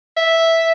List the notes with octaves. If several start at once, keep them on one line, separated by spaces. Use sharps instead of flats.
E5